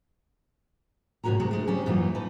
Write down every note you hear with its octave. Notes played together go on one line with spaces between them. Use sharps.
A2 C3 C#4 F#4 A#4 A#5
D2 C3 G#3 F#4
D3 G#3 A3
G3 C4 C#4
F#2 A#2 E3 C#4 D#4 F4
D#4 A4 B4